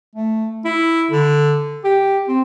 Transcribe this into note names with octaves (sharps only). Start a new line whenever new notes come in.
A3
E4
D3
G4
C4